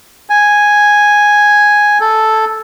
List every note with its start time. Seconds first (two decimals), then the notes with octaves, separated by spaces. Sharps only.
0.30 G#5
2.00 A4